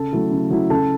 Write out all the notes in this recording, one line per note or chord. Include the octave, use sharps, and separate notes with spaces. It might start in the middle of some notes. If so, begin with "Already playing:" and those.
Already playing: C#3 A4 A5
F#3 A3 E4
C#3
F#3 A3 E4
C#3 A4 A5